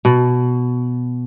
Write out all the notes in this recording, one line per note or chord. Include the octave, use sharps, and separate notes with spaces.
B2